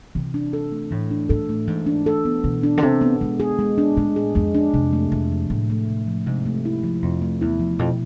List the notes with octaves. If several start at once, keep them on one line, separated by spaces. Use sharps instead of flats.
C3 E3
D4
A4
A3
A2 E3
D4
A2 A4
A3
G#2 E3
D4
A4
B3
B2 E3
D4
D3
C3 A4
B3
B2 G#3
G#4
G#3
D4
A2 G#3
G#4
F2 G#3
D4
F2 C3
A3
F2 C3
F3
A2 C3
A3
C3
F3
G#2 C3
A3
E4
F3
F2 C3
A3
E2 E4
F3
F2 B2